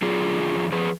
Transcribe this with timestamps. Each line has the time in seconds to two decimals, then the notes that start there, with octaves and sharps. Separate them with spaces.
0.02 F#3 F4 G#4
0.20 D3
0.37 F2
0.55 F2
0.72 F3 G#4 B4